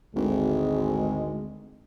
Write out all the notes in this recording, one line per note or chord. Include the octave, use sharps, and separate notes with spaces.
G#1 D2 G#3